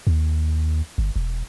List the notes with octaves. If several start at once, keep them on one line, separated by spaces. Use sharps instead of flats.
D#2
G1
E1